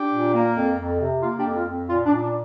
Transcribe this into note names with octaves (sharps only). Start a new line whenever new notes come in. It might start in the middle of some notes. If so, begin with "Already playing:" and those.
Already playing: D4 G4
A#2
A#3
F2
F2
C3
A#3 F4
D4 G4
F2
F4
F2
A#2 F4
D4
A#2
D4